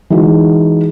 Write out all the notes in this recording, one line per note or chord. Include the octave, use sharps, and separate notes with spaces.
E3 G#3 D#4 F#4